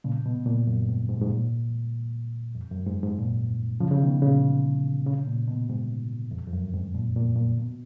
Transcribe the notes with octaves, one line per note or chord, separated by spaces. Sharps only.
A#2 C#3
B2
A#2
F#2
G#2
G#2
G#2
A#2
F2
F#2
G#2
G#2
A#2
C#3 F3
C#3
B2 D#3
A#2 C#3
A#2 C#3
A#2
B2
G#2
F2
F2
F#2
G#2
A#2
A#2
A#2
B2